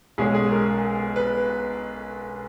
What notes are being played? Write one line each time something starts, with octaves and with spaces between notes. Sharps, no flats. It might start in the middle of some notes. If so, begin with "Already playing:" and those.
B1 B2 G#3 C#4 G#4
G#4
A#4
B4